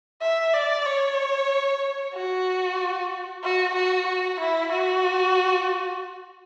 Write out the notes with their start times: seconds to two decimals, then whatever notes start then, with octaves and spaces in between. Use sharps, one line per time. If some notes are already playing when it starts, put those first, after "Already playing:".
0.22 E5
0.54 D5
0.86 C#5
2.14 F#4
3.44 F#4
3.75 F#4
4.07 F#4
4.40 E4
4.72 F#4